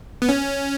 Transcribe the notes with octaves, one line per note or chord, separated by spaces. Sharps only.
B3
C#4